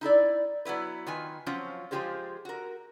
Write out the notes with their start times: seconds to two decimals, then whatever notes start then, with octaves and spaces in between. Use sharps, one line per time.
0.01 D#4 E4 A4 D5
0.65 F#3 B3 E4 B4
1.07 D#3 F4 B4 G#5
1.46 F3 F#3 C4 C#4 F4
1.91 F3 G#3 F4 G4 G#4 C5
2.45 F#4 A#4